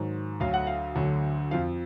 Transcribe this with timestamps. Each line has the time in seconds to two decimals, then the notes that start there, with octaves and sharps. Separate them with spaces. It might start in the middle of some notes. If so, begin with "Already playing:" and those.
Already playing: G#2 D#3 F#3
0.40 D2 D3 F#3 F5
0.54 F#5
0.67 F5
0.95 D2 D3 F#3
1.51 F2 F3 F5